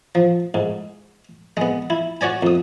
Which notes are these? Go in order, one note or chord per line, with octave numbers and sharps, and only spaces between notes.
F3
G#2
G#3 B3
E4
F#4 C#5 D5 G#5
F2 D#6